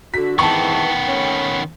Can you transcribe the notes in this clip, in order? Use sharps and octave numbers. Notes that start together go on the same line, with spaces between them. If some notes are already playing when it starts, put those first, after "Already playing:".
D3 F#4 B6
F2 G#2 D#3 E3 B3 G5 A5 C#6
A3 C#4